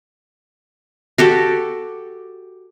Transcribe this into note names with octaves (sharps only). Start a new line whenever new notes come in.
F#4 G4 A4